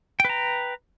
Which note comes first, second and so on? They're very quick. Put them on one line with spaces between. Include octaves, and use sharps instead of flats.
G5 B4 A#5